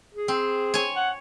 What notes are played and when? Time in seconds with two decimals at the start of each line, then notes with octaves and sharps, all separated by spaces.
0.14 G#4
0.28 C4
0.74 C#5 G#5
0.95 F#5